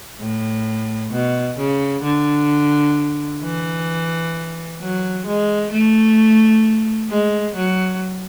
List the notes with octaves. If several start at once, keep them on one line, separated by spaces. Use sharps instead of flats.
A2
B2
C#3
D3
E3
F#3
G#3
A3
G#3
F#3